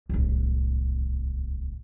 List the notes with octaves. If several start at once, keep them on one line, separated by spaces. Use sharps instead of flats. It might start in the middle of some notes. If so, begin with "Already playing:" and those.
D1 C2